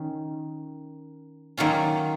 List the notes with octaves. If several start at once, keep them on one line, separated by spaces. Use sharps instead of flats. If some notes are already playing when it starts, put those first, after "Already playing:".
Already playing: D#3 C#4
D#3 F#3 A#3 C#4 F4